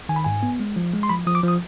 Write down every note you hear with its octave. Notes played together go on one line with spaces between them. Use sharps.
D#3 G#5
B5
G#2 G#5
B3
G#3
F3
G#3
C6
F3 B5
F3 D#6
D6
F3 D#6